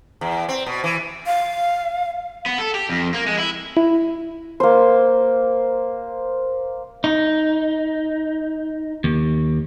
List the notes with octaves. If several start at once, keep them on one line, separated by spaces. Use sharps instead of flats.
E2
C4
B2
E3
F5
B3
A4
G4
F2
A#3
G#3
E4
E4
A#3 C5
D#4
D#2